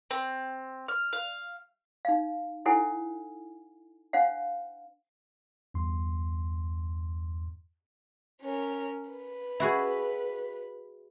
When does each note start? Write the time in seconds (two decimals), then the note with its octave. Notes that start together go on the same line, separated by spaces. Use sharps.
0.11 C4
0.88 F6
1.13 F5
2.05 D#4 F5
2.65 D#4 E4 A4 C5 F#5 G#5
4.13 D4 C5 F5 F#5
5.74 E2 G2 C6
8.42 C#4 A#4
9.11 B4
9.60 E4 F#4 G#4